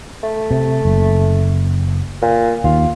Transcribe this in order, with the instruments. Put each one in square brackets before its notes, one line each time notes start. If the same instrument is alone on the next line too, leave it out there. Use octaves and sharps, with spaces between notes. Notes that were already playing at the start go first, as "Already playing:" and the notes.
[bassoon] A3
[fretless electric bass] C3
F#1
[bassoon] A#2
[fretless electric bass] D#2 [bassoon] F4